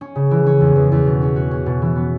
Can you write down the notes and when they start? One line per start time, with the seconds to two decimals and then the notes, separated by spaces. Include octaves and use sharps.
0.01 C#4
0.16 C#3
0.31 E3
0.46 C#4
0.61 E2
0.76 E2
0.92 E2
1.06 B2
1.22 C#4
1.36 F#4
1.51 C#4
1.66 B2
1.82 E3
1.96 B3